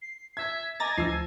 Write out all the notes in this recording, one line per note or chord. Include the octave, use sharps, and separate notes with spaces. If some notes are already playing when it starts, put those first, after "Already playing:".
C7
E5 G#6
D#5 G#5 A#5 D6 A6 A#6
D2 F3 E6 C7